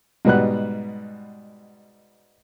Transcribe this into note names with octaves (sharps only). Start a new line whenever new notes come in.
G#2 B2 G3 B4 F#5 F#6